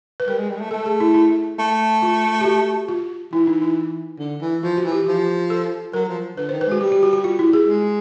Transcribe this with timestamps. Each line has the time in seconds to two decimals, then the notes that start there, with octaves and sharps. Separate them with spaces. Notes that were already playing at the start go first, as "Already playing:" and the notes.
0.20 B4
0.28 G3 A#4
0.38 G#3
0.50 G3
0.56 G#3
0.60 A3
0.71 A3 A4
0.86 G#4
1.00 E4
1.15 E4
1.59 A3
2.02 F4
2.41 G4
2.45 F#4
2.88 F4
3.33 E3 E4
3.47 D#4
3.62 E4
4.19 D3
4.41 E3
4.63 F3 F4
4.77 F#4
4.84 E3
4.92 G4
5.06 F3 G4
5.50 A4
5.93 F#3 A#4
6.08 F3
6.37 D3 B4
6.49 D#3 C5
6.61 B4
6.67 G#3 F#4
6.81 G3 G4
6.92 G4
7.03 F#4
7.13 F#4
7.24 F4
7.39 E4
7.53 G#4
7.67 G#3